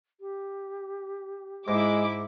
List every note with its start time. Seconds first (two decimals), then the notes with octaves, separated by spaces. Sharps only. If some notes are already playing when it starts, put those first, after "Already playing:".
0.21 G4
1.68 G#2 G#3 E4 D6